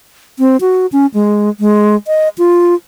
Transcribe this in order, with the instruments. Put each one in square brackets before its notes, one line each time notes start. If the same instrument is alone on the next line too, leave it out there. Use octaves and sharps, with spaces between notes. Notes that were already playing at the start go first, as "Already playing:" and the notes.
[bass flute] C4
F#4
C#4
G#3
G#3
D#5
F4